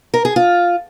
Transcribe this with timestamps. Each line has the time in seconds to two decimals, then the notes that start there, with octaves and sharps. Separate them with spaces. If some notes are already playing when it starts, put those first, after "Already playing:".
0.14 A#4
0.25 G#4
0.36 F4